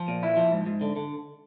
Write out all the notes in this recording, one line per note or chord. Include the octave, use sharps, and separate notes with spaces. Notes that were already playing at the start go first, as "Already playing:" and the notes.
Already playing: F3
A#2
E4
F3
G#2
G#2
D3
D3